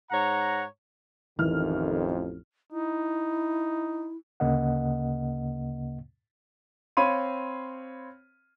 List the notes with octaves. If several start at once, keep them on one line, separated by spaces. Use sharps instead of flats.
G#2 C#5 F#5 A#5
A1 F2 D#3 E3 F6
D#4 E4
D2 C#3 A#3 D#5 F#5
C4 C#5 F5 B5 C6 D#7